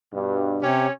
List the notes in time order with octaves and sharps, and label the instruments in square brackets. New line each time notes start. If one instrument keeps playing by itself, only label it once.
[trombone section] G2 B2
[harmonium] C3 G4 [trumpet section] C#4 C#5